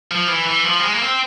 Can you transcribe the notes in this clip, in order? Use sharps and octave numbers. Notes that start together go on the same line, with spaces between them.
F3
E3
E3
F3
G3
G#3
A#3
C4